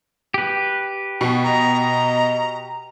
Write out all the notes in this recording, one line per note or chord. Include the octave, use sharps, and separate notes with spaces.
G4 B4
B2
D#5 A#5